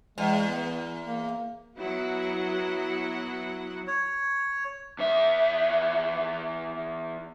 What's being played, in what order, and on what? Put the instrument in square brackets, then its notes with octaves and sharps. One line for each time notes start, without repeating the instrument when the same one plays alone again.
[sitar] E2 [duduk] G#3
[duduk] B3
A#3
[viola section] F#3 B3 E4 F#5
[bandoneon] C#5
[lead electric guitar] E2 E5